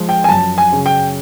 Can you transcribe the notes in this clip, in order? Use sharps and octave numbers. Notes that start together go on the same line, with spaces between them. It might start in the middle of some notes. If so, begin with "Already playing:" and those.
Already playing: F3 G#3
G5
G#5
F#2 A5
G#5
C#3
G5